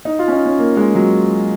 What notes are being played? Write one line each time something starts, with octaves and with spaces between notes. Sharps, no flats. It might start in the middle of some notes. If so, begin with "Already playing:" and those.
D#4
F4
C#4
D#4
C#4
A#3
G#3
F#3